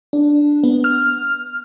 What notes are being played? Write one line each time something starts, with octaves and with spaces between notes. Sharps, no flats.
D4
B3
F6